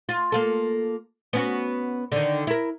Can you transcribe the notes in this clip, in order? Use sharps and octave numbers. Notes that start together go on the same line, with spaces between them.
F4
A#3 F4 A4
B3 C#4 F#4
D3 D#3
E4 A#4